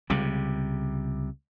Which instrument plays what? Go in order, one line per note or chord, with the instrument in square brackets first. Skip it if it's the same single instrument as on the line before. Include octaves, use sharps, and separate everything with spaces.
[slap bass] C#2 C3 G3